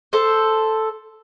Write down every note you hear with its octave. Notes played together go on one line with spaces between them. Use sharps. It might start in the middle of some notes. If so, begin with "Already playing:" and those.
A4 C5